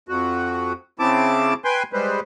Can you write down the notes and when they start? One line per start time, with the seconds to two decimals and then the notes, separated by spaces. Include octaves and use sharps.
0.09 F2 F#4
0.99 C#3 C4 E4 A5 D6
1.65 B4 G5 G#5 C6
1.93 G3 G#3 B4 C5